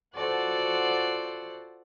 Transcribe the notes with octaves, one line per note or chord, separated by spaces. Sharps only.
F4 F#4 A4 C5 D5 F#5